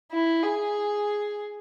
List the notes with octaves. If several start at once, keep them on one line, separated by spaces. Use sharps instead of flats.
E4
G#4